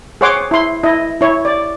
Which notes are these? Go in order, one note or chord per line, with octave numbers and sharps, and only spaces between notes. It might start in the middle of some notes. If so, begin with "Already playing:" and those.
G#4 C5 C#5 F#5 C6 D6
E4 C6
E4 D#5
E4 C#5
D5